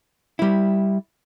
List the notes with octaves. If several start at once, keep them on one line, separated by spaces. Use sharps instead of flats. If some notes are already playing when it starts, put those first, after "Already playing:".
G3 E4